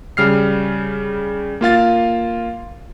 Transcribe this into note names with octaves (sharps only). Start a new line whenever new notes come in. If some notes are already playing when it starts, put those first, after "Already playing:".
C#3 G3 F6 C7
A#3 F4 F5 A6